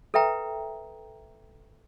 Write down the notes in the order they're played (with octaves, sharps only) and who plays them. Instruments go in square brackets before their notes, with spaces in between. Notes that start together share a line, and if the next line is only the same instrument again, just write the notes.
[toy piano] A4 B4 E5 G5 A#5